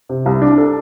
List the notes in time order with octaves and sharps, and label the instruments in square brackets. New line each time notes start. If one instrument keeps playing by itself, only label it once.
[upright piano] C3
C2
D4
A4